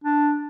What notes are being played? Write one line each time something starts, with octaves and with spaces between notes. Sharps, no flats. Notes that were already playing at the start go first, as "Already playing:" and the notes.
D4